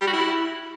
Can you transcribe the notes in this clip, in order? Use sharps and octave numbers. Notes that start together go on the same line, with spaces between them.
G3
F#4
E4